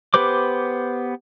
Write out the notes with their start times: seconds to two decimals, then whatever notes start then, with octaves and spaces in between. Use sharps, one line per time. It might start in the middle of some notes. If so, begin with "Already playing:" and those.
0.14 B3 G4 B4 C5 D6